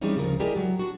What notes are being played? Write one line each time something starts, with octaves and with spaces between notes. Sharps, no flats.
E3 G3 G#3 C4 C#4 D#4
D2 C#3 F3 A#4
G#3 E4 G4 G#4 A#4 D5
F#3
D4 F#4